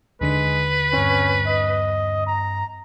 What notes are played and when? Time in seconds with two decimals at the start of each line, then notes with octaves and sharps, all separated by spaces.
0.21 D#2 D3 G#3 B4 B6
0.93 G2 C4 C#4
1.47 D#5
2.27 A#5